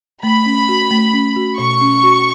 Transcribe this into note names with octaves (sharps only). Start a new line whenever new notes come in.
A3 B5
C#4
F#4
A3
C#4
F#4
B2 C#6
C#4
F#4